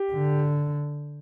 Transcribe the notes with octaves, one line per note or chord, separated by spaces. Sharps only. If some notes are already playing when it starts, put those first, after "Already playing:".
Already playing: G4
D3